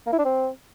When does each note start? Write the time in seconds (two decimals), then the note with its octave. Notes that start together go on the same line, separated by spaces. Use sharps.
0.06 A#3
0.13 E4
0.19 D4
0.25 C4